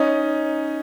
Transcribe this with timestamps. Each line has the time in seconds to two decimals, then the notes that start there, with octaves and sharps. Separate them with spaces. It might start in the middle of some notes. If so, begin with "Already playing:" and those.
Already playing: C#4 D#4